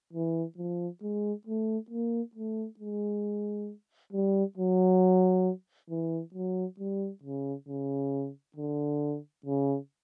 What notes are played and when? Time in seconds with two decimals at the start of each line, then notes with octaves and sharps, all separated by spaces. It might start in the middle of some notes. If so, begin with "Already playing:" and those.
0.13 E3
0.57 F3
1.02 G#3
1.47 A3
1.90 A#3
2.35 A3
2.80 G#3
4.13 G3
4.58 F#3
5.90 E3
6.34 F#3
6.80 G3
7.23 C#3
7.68 C#3
8.56 D3
9.46 C#3